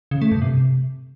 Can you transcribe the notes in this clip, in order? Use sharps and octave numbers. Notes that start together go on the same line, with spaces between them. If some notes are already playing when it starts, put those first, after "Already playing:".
C#3
A3
G2
C3